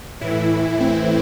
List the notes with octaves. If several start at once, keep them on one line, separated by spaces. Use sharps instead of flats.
A2 E3 E4
C4